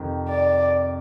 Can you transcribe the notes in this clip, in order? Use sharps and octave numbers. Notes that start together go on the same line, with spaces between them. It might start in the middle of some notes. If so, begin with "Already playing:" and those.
Already playing: F2 C3 D#3
D5